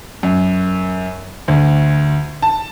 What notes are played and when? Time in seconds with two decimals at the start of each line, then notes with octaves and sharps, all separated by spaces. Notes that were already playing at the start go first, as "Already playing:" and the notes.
0.23 F#2
1.48 D2
2.42 A5